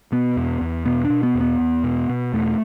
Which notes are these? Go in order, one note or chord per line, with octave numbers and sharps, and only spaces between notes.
B2 B3
E2
E2
B2 B3
D4
B2
B3
E2
B3
E2
B2
B2
E2 A3